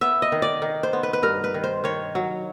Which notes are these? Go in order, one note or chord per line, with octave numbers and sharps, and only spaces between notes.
B3 E5
D#5
D#3
D5
D#3
C5
B3
B4
B4
G2 A#4
B4
D#3
C5
D#3 C#5
F#3